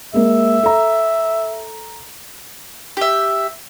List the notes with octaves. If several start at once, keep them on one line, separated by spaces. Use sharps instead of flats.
G#3 A#3 E5
A4 A#5
G4 E5